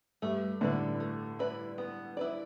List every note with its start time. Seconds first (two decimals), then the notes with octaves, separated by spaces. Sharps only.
0.22 G2 A3
0.61 A2 D3 E4 B4 D5
1.00 A3
1.39 E4 B4 D5
1.78 B3
2.17 E4 B4 D5